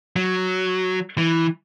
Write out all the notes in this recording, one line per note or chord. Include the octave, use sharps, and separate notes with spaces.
F#3
E3